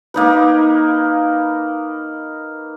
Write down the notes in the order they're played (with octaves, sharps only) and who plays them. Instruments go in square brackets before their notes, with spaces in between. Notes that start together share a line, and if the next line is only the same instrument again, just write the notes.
[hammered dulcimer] A#3 D#4 B4